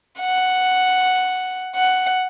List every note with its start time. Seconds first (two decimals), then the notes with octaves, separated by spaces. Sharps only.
0.20 F#5
1.76 F#5